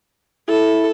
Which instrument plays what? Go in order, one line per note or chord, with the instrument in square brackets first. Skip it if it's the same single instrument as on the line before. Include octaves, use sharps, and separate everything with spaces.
[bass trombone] E4 [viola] A4